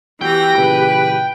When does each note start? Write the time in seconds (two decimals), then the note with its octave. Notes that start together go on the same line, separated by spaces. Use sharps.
0.21 E3 B3 F#4 G4 G5 B5 A#6
0.57 A#2 C#3 E3 B4